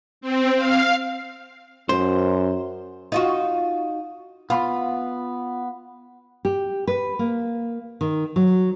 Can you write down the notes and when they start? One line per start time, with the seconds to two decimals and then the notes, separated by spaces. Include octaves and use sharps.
0.21 C4
0.55 F5
1.89 F#2 C5
3.12 D#4 F4 F#4
4.50 B3 F4 B5
6.45 G4
6.88 B4
7.19 A#3
8.01 D#3
8.36 F#3